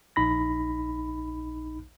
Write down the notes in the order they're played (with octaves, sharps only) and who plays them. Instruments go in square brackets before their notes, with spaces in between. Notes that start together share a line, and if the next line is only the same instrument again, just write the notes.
[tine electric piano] A#1 D#4 B5 A#6